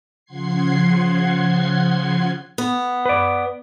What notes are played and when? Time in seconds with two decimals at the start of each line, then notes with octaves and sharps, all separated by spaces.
0.25 C#3 F3 F#5 C6 G#6 C7
2.58 B3
3.06 B4 D5